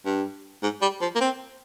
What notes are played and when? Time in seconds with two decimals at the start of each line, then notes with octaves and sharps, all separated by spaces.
0.05 G2
0.63 G#2
0.81 G3
1.01 F3
1.15 A#3
1.21 C4